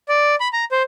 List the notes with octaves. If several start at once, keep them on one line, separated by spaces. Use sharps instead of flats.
D5
B5
A#5
C5